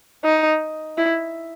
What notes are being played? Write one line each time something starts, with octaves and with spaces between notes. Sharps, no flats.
D#4
E4